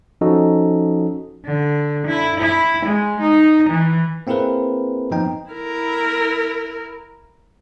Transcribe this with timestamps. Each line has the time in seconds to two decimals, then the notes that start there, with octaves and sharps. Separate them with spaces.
0.21 F3 C#4 D#4 F#4 A4 D#5
1.45 D3
2.07 E4
2.40 E4
2.86 G#3
3.21 D#4
3.70 E3
4.27 A#3 C4 E4 G#4 A#4 B4
5.11 F3 B3 D#4 G5
5.50 E4 A#4